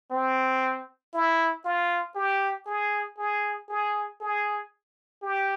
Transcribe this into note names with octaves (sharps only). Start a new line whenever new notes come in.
C4
E4
F4
G4
G#4
G#4
G#4
G#4
G4